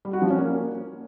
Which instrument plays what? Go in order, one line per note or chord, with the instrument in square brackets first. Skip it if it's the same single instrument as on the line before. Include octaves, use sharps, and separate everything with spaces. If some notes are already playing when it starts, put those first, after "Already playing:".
[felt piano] G3
F#4
F3
C#4
A#3